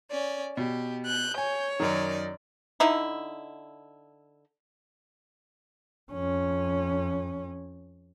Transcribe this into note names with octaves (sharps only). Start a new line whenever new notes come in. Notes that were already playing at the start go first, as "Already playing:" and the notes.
C#4 D5
B2 G4
F#6 G6
C#5 G#5
F#2 D#3 D#4 D5
D3 D#4 E4
F2 C#4